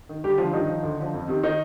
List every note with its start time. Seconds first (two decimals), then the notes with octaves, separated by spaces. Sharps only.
0.09 D#3
0.23 D2 G3 G4
0.38 D3 F3 F4
0.53 G2 D#3 D#4
0.69 F3
0.83 D2
0.99 D3 F3
1.14 F2
1.28 C3 D#3
1.43 D#3 D#4